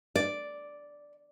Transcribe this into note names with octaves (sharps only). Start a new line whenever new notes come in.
D5